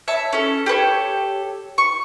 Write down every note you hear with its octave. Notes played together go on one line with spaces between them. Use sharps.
C#5 E5 A5
C#4 A4
G4 A4 B4 C#5
C#6